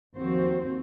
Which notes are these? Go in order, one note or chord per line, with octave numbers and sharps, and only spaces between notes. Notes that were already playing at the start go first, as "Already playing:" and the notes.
D#2 F3 C4 F#4 C5